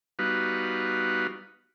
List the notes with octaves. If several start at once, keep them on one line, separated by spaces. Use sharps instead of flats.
G3 B3 D#4 F#4 B4 F5